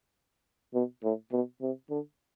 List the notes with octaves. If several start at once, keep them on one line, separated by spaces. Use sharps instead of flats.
B2
A2
B2
C3
D3